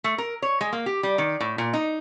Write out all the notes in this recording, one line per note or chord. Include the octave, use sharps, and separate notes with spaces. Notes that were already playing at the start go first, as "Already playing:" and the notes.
A3
A#4
C#5
G#3
A#3
G4
G3
D#3
A2
A#2
D#4